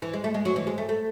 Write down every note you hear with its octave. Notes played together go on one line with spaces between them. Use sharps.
E3
G#3
A3
G#3
F#3
E3
G#3
A3
A3